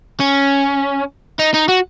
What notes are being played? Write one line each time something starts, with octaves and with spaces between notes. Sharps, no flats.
C#4
D#4
D#4
F#4